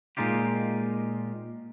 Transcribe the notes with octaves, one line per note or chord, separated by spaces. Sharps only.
A#2 C#3 G#3 D#4 F4 G4